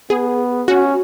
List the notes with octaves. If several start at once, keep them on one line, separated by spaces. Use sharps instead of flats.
B3 G#4
C#4 F#4